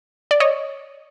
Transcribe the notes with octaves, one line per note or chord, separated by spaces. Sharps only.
D5
C#5 D#5